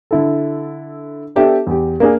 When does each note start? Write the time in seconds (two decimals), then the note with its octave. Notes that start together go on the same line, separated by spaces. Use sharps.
0.11 D3 E4 A4
1.36 B3 D4 G4 A4 E5
1.67 E2 G4
2.00 A#3 D4 G#4